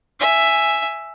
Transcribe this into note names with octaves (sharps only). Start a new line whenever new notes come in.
E5 G#5